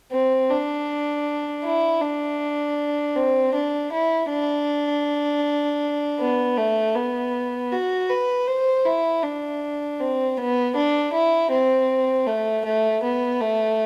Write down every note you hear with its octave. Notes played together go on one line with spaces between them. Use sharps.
C4
D4
E4
D4
C4
D4
E4
D4
B3
A3
B3
F#4
B4
C5
E4
D4
C4
B3
D4
E4
C4
A3
A3
B3
A3